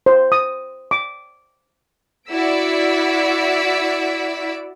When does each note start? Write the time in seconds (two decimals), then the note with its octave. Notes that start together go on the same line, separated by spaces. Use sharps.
0.06 C5
0.32 D#6
0.91 D6
2.31 E4 F#4 D5 E6 B6 D7